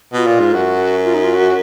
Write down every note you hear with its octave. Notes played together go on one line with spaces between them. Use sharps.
B2 F4 F#4
A#2
G#2
F#2 F#4
F4
D#4
F4
F#4